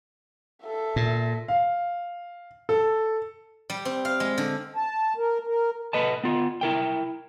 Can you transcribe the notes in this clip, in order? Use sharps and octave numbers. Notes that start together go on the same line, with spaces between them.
A4 E5
A#2
F5
A4
G3
C4
F5
G#3
D3
A5
A#4
A#4
A4 B4 D#5 A5
B3 F4
E4 A#4 G5